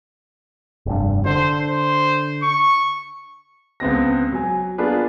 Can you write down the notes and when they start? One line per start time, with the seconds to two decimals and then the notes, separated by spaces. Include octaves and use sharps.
0.86 F1 G2
1.26 D3 C5
1.61 C5
2.43 C#6
3.80 C#2 B3 C4 A#6
4.32 F#3 G#5
4.78 A#3 B3 D4 F4 G#4 B4